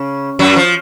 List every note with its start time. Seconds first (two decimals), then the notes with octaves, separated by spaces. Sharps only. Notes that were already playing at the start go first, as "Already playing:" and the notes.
Already playing: C#3
0.39 F#2 F#3
0.56 F3